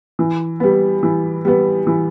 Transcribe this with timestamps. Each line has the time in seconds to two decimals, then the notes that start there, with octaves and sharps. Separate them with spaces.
0.19 E3
0.60 G3 B3
1.03 E3
1.45 G3 B3
1.87 E3